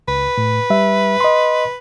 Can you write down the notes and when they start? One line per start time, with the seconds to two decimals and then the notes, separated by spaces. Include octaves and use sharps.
0.08 C#2 B4
0.38 A2
0.70 G3 E5
1.21 D#5 C6